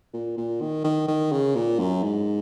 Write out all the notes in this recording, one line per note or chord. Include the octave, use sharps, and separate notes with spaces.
A#2
A#2
D#3
D#3
D#3
C#3
A#2
F#2
G#2